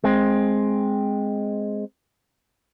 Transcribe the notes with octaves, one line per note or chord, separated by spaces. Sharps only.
G#3 C4